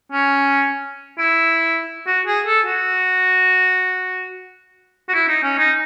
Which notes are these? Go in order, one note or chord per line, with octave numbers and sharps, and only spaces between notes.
C#4
E4
F#4
G#4
A4
F#4
F#4
E4
D#4
C#4
D#4